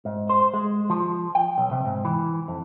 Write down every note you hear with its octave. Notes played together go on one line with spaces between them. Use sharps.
G#2
C5
G#3
F3
G5
B1
C3
G#2
E3
F2